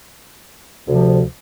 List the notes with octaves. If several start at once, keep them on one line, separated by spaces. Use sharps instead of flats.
D2 C3 F3